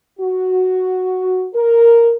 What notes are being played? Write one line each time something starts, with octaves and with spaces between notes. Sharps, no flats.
F#4
A#4